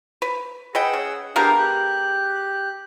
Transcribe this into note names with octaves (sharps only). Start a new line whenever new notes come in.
B4
G#4 B4 D#5 F#5 G5 E6
C#3
G#3 B3 D4 G4 A#4 F5
G4 F#6